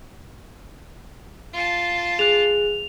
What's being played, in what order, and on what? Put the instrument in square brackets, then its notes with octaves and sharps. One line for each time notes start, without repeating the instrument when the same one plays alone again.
[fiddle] F4 A5
[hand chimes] G#4 F#6 [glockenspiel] F7